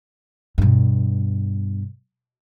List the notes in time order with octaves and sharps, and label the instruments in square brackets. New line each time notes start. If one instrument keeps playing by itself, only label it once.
[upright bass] G2 B2